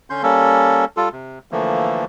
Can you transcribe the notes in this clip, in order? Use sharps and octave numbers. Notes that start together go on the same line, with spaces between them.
D3 C#4 C6 G6
G3 A#3 C#4 A4
G3 F4 A4
C3
D3 E3 F3 A3 A#3